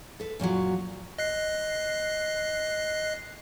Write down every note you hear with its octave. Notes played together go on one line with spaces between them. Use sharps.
A4 B4
F#2 A#2 D#3 F#3
D#5 F#6 C7